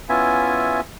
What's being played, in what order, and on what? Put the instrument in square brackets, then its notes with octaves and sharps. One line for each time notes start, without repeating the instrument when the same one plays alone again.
[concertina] B3 C#4 E4 F4 E5 G#5